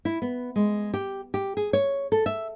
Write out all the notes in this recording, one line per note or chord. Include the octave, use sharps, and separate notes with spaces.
E4
B3
G#3
G4
G4
G#4
C#5
A4
E5